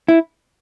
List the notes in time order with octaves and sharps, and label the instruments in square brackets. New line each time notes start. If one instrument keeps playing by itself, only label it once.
[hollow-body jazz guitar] E4